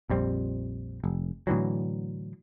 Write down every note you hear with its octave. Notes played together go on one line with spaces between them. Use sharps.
A#1 F2 G3 C4
F1
A2 D3 E3 F#3